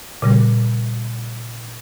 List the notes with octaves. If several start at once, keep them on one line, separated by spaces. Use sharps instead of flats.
A#2 C#3 G3